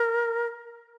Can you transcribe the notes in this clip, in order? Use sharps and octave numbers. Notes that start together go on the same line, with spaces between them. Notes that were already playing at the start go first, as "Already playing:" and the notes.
Already playing: A#4